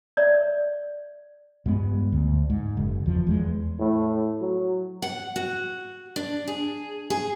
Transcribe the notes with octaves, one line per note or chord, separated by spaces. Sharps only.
C#5 D5 E5
G2 G#3 B3
D2
G#2
F#1
E2 F3
E2 F#3 G#3
A2
F#3
F#5
F#4
D4
G#4
G#4